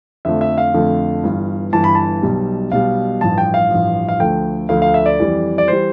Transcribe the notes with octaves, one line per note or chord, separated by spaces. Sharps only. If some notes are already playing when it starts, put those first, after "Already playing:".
F2 D3 F3 A3 E5
E5
F5
F2 D3 F3 A3
G1 G2 E3
G1 G2 E3 A5
B5
A5
B1 B2 G3
B1 B2 G3 F5
A1 G2 F3 A5
G5
F5
A1 G2 F3
F5
D2 D3 F3 A3 G5
D2 D3 F3 A3 F5
F5
E5
D5
F2 E3 G3
D5
E3 G3 C5